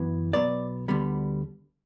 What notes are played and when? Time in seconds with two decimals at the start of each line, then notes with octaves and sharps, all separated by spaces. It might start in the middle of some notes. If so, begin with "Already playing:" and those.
Already playing: F#2 E3 B3
0.33 B1 B2 F#3 B3 D5
0.88 D2 D3 G3 B3